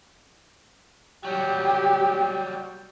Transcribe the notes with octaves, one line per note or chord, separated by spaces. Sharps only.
F#3 G3 G4